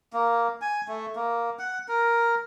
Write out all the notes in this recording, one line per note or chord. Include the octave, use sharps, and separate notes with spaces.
A#3
G#5
A3
A#3
F#5
A#4